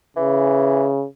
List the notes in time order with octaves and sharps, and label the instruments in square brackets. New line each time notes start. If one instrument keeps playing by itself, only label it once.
[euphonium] C#3 [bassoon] E3